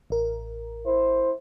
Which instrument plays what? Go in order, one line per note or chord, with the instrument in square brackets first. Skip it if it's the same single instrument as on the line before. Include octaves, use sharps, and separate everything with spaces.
[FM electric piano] A1 A#4
[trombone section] E4 C5